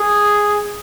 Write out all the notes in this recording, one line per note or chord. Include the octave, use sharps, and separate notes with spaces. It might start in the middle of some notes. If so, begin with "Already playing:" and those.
Already playing: G#4